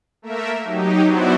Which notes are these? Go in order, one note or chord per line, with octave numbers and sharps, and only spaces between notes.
A3 A#3 A#4 E5
F#3 D#4 G4
F#3 B3 D4 E4 F#4 C5